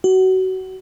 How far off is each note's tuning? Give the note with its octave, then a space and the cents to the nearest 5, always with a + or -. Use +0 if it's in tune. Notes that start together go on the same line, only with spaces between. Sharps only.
F#4 +25